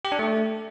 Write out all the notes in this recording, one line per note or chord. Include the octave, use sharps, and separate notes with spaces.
G4
D4
A3